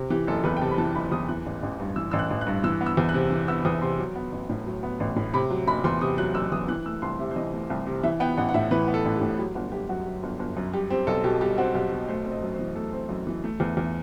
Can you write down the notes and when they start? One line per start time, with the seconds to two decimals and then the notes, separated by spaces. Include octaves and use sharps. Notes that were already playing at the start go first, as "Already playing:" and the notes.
Already playing: C3
0.10 E3 G4
0.27 F#1 A4
0.44 E2 B4
0.57 G5
0.61 C3 A5
0.71 B5
0.78 E3 A5
0.95 F#1 B5
1.12 E2 D#6
1.28 E3 F#6
1.46 A1
1.63 A1
1.79 G2
1.96 E3 E6
2.11 A1 E6
2.19 F#6
2.30 A1
2.41 F#6
2.47 G2
2.64 E3 E6
2.81 B3
2.86 E6
2.97 E2
3.09 F#6
3.14 C3
3.31 E3
3.48 B3 E6
3.65 E2 D#6
3.82 C3 C6
3.99 F#3
4.16 B3
4.32 A1
4.49 A2
4.66 F#3
4.83 B3
5.00 A1
5.16 A2
5.33 C3 B5
5.50 F#3
5.67 F#1 B5
5.84 E2 C6
6.01 C3 D#6
6.18 F#3 F#6
6.35 F#1 E6
6.52 E2 D#6
6.68 E3 F#6
6.85 A3 E6
7.02 C2 C6
7.19 C3 E5
7.31 C5
7.36 E3 D#5
7.53 A3
7.70 C2
7.87 C3
8.03 E3 E5
8.20 B3 G5
8.37 A1 F#5
8.49 F#5
8.54 A2 E5
8.71 E3 B4
8.87 B3
8.94 A4
9.05 A1
9.16 G4
9.21 A2
9.38 F#3 G4
9.55 G1 F#4
9.72 G1 G4
9.89 F#2 F#4
10.06 F#3
10.23 G1
10.39 G1
10.57 F#2
10.73 G3 G4
10.90 C4 G4
11.07 B1 A4
11.24 B2 G4
11.41 G3 G4
11.58 C4 F#4
11.74 B1 G4
11.92 B2
12.08 A3 C5
12.26 C4
12.31 D#5
12.42 F#2
12.54 C5
12.59 E3
12.76 A3 A4
12.93 C4
13.09 F#2
13.27 E3
13.44 A3
13.60 E2
13.77 E2